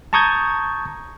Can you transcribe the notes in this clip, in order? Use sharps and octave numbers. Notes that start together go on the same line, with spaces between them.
A5 A#5 C#6 D#6 G6 G#6